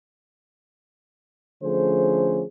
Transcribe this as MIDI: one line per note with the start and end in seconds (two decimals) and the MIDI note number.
1.63 2.43 50
1.63 2.43 53
1.63 2.43 57
1.63 2.43 61
1.63 2.43 68
1.63 2.43 72